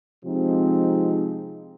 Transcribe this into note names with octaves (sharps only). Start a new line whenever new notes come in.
C3 F3 G#3 C4 D#4